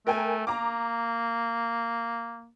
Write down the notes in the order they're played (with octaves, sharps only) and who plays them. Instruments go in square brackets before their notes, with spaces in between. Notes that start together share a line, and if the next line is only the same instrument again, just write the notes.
[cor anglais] A3 [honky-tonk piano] A#4 G5 G#5
[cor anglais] A#3 [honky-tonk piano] A#5 D6